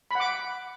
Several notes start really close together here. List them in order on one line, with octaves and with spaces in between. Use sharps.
B5 F#5 D6